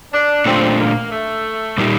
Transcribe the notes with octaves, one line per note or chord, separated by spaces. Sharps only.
D4
A#2 A3 C4 D4 F4
A#3
A3
A#2 G3 A#3 D#4 G4